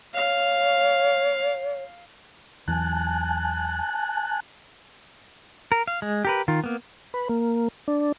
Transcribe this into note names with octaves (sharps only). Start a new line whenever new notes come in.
C#5 F5
E2 E3 F#3 G#5 A5 F#6
A#4
F5
G#3
G4 A#4 B4
D#3 F4
A#3 B3
B4
A#3
D4